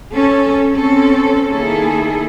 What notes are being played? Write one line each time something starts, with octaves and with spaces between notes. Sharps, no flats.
C#4 A4
C4 C#4 A4
D#3 A#3 E4 G#4 A4